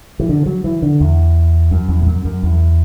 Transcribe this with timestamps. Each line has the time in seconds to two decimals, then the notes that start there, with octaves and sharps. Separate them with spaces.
0.20 E3
0.29 D3
0.46 F#3
0.64 E3
0.82 D3
1.00 E2
1.71 F#2
1.88 E2
2.01 A2
2.07 F#2
2.25 F#2
2.43 E2